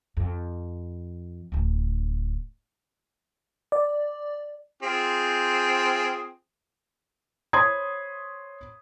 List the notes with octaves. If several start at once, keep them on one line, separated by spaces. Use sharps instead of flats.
F2
D1 D4
D5
C4 F4 G#4
C5 C#5 B5 C6 D#6 G#6